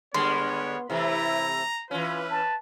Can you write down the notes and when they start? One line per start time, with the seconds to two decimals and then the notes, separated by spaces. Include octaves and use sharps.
0.14 D3 G3 G#3 B3 C#5 C6
0.90 C3 E3 A3 E4 A#5
1.91 E3 C#4 F4 B4
2.30 A5